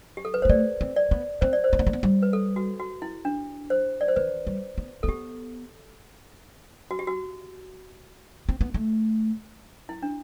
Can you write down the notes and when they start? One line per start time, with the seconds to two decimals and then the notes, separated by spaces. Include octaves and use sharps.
0.17 G4
0.25 A4
0.34 B4
0.42 G3 C5
0.49 A3 D5
0.81 C4
0.96 D5
1.11 B3
1.41 C4 C5
1.53 D5
1.64 C5
1.73 C4
1.79 B3
1.87 A3
1.93 B3
2.03 G3
2.22 B4
2.33 A4
2.56 F#4
2.80 F#4
3.02 E4
3.25 D4
3.70 C5
4.01 D5
4.08 C5
4.16 E3 B4
4.47 G3
4.78 B3
5.03 C4 A4
5.08 B3 G4
6.91 F#4
6.99 G4
7.07 F#4
8.49 C4
8.61 B3
8.74 A3
9.89 E4
10.03 D4